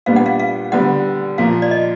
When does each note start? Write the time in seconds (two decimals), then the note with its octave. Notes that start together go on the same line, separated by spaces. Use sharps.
0.06 A#2 G3 B3 D4 F5
0.16 F#5
0.26 F5
0.39 F5
0.72 D3 G3 B3 F#5
1.38 A#2 F3 A#3 F5
1.62 D5
1.71 D#5